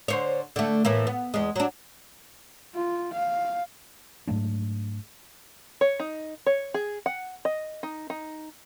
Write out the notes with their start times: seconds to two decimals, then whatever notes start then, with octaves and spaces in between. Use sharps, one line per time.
0.08 D3 C5 C#5
0.56 D3 A3
0.85 A2 E3 A#3
1.07 B3
1.34 E2 G#3
1.56 F#3 D4
2.75 F4
3.13 F5
4.27 G#2 F#3 A3 D4
5.81 C#5
6.00 D#4
6.46 C#5
6.74 G#4
7.06 F#5
7.45 D#5
7.83 D#4
8.10 D#4